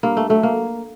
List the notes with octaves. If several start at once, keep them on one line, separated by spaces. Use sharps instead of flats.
G2 A#3
A3
F#3 A3
A#3